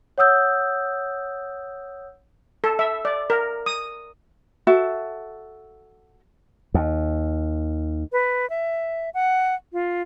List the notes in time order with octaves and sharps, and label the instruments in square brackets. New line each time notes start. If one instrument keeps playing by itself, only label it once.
[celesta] C#5 F#5 D#6 E6 G6
[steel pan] A4
E5
D5
A#4
D#6
[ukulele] F#4 A4 E5
[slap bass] D#2
[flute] B4
E5
F#5
F4